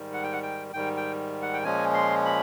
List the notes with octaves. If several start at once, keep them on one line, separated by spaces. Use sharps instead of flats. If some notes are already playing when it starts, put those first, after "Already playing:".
Already playing: G#2 D#3 G3
F#5
G5
F#5
G5
G#2 D#3 G3 G5
G5
F#5
G5
A#2 F3 G#3 C#4 G#5
C6
B5